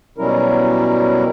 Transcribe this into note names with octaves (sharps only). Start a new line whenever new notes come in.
B2 F#3 G3 C#4 E4 A#4